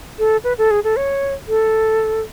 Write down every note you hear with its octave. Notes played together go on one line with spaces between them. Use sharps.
A4
B4
A4
G#4
A4
C#5
A4